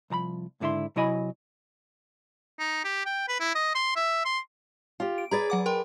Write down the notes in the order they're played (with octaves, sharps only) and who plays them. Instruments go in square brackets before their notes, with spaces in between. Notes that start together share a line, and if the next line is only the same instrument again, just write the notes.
[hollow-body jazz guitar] C2 F3 A#5 B5
C#2 G#2 D3 E4 E5 C6
C3 F#3 E4 D#5 G#5 B5
[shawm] D#4
G4
G5
B4
E4
D#5
C6
E5
C6
[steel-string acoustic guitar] F4 G4
[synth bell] D7
[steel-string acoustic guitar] G#4 B4 D5 [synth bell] A#5 G#6 A6
[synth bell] F#3 F#5 D6
A#4 G5 C6